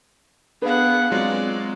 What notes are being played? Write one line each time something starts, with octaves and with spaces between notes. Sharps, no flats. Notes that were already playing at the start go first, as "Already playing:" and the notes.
B3 D4 G#4 B4 F5 F#5
F#3 G#3 C4 F4 D5